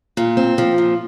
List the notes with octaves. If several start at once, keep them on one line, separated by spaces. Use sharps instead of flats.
A#2
C4
F3
A#2